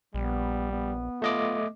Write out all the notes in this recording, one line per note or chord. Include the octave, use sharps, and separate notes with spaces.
A#1 G3 B3
B3
A3 F4 D#5 D6